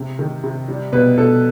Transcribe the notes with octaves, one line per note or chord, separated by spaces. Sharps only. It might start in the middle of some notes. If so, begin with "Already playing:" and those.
Already playing: C3
D#3
C3
G3
B2 B4
B2 A4